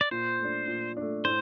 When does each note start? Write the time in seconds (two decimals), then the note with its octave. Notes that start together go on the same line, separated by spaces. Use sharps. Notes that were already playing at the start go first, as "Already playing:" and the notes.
0.01 D5
0.11 A#2 C5
0.40 A3 D4
0.68 A#2
0.97 A3 D4
1.25 A2 C5